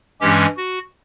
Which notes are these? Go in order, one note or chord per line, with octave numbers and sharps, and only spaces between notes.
G2 E3 G#3 C#4 G4
F#4